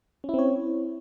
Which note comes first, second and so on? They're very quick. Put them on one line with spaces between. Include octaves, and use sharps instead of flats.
C#4 E4 C4 C#5